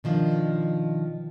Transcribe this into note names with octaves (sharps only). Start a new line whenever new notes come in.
B2 D#3 F3 D4